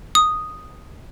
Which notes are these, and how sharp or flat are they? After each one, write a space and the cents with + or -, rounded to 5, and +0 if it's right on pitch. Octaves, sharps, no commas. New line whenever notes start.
D#6 -5